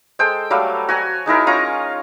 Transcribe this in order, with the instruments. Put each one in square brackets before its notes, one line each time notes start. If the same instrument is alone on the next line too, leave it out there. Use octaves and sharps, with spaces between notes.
[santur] G#3 A4 C5 G5
F#3 G3 A3 F5
F#4 G#5 A#5
G#3 D#4 E4 A#4
C#4 F4 A#5 C#6